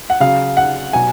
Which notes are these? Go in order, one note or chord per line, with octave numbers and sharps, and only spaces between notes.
F#5
C#3 F#3 F5
F#5
B2 F#3 G#5